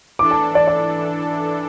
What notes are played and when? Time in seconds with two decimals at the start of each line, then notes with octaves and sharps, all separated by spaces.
0.19 E3 D4 A4 D6
0.31 A5
0.55 D5
0.68 D5